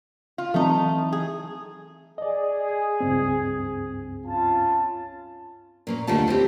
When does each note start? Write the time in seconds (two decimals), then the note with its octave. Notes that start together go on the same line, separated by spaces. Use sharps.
0.38 F4
0.54 E3 F#3 A3 C4 D#4
1.13 G#4
2.18 G#4 D5 D#5
3.00 C#2 G2 C4
4.26 C#4 F4 A5
5.87 A#2 A#3 C#4
6.07 D#2 D3 G3 A3 F4 A5
6.27 C4 E4 G4